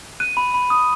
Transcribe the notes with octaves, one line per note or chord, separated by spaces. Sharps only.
F#6 D#7
B5
B5
D#6